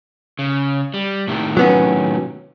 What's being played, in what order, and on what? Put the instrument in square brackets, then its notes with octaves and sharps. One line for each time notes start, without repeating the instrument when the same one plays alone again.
[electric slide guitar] C#3
G3
A2 C3 D#3
[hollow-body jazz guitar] F#3 B3 C#4